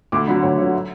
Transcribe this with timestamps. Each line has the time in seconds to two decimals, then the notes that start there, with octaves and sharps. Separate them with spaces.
0.12 D2 D6
0.27 D3 F#3 B5
0.43 D2 C#5
0.58 D3 C#5
0.62 F#3
0.73 E5